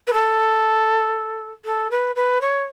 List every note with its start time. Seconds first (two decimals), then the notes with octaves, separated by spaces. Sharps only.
0.07 B4
0.13 A4
1.65 A4
1.91 B4
2.15 B4
2.41 C#5